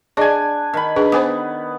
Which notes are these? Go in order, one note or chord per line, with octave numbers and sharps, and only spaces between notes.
D4 G#4 D5 D#5 G#5
D#3 B5
D4 G#4 B4
B3 C5 G#5 D6